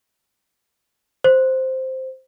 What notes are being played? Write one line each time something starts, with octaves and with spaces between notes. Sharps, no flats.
C5